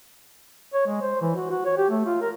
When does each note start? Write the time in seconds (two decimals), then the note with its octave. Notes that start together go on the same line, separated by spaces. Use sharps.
0.74 C#5
0.87 G#3
1.02 C5
1.21 E3
1.36 F#4
1.51 F#4
1.65 C#5
1.78 G4
1.90 A3
2.06 F4
2.22 A#4